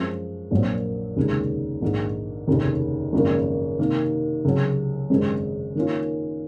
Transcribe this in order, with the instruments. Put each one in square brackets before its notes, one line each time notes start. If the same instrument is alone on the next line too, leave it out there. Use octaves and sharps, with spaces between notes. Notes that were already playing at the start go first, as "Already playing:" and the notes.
Already playing: [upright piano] F#2 F3 G#3 C4
A#1 A#2 F#3 C4
F1 D#2 C#3 G#3
A#1 G#2 D#3
F1 D#2 C#3
G#1 F#2 C#3 F3 A#3
C3 D#3 A#3
C#2 C3 F#3
G#1 F#2 C#3 G#3 C4
D#3 A#3 C#4 F4